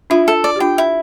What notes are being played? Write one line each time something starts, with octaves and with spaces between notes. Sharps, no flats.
D4 E4 F4
A4
D5
G4
D4 F4 G5
E4